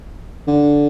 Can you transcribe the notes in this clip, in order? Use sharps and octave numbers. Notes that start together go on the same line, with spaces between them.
D3